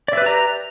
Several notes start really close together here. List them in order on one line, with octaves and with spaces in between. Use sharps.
D5 E5 B4 G4 A#5